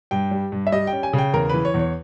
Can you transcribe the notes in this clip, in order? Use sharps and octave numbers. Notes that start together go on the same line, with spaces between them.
G2 G5
G3
G2
E5
G3 D#5
G5
C#4
G#5
C#3
G5
E2 A#4
E3 B4
C#5
E2
C#5